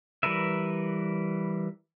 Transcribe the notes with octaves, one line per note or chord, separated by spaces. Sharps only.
E3 G3 A#4 B4 E5